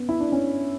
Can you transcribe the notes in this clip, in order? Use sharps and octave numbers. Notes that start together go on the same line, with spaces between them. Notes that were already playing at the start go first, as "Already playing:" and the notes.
Already playing: B3 C#4
E4
D4
C#4